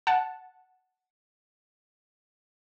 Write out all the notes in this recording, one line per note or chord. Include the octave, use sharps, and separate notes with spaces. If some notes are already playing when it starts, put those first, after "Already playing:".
F#5 A5